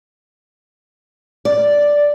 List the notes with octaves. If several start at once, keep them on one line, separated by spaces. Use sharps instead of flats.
D5